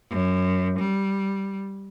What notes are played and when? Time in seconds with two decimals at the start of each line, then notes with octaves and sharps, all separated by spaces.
0.11 F#2
0.79 G3